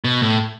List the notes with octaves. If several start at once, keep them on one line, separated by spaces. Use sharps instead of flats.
B2
A2